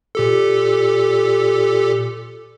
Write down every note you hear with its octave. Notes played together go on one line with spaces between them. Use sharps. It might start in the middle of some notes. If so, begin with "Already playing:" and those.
A#2 G4 A4